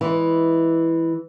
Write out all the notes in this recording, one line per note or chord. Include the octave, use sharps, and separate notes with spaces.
E3 G#3